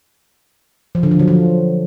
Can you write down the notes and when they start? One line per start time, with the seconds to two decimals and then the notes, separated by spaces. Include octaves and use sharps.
0.95 F3
1.03 D3
1.11 F3
1.19 F#3
1.28 F3